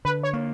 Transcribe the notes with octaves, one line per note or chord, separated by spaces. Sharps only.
D3 B4
C#5
A#3